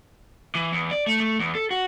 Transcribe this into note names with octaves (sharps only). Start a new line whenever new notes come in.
E3
E2
D5
A3
A3
E2
A4
F#4